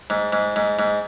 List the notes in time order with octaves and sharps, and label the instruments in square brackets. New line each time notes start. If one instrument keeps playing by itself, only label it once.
[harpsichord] G#2
G#2
G#2
G#2